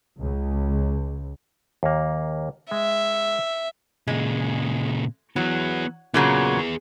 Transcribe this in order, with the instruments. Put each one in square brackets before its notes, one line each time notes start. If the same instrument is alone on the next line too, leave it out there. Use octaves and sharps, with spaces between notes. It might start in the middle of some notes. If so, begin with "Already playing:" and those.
[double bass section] C#2
[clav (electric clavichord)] D#2 A#3
[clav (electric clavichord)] G#3 [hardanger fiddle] E5
[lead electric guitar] A#2 C#3 [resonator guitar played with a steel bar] G#3
[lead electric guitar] E3 B3 [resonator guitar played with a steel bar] F#3
[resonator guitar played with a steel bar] A#2 C#3 F#3 [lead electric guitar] B3 G#4